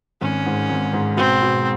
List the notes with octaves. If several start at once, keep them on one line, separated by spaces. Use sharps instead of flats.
G#1 C#4
G#2
G#1
G#2
B2 C4
B2